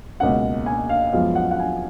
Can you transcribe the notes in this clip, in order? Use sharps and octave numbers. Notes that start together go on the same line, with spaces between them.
C#2 B2 A#3 C#4 F#5
G#5
F5
F#2 F3 G#3 B3 F5
F#5
F#5
G#5